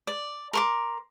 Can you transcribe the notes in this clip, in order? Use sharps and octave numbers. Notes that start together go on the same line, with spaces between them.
D5
A#4 C6 D6